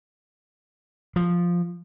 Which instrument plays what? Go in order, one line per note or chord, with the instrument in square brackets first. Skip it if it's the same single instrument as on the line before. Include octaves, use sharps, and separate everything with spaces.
[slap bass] F3